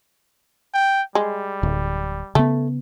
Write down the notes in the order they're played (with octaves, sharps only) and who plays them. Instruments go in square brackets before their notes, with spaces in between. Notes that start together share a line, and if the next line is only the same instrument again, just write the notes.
[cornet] G5
[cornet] G3 [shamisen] G#3
[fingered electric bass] D1
[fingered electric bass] C#3 B3 [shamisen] A3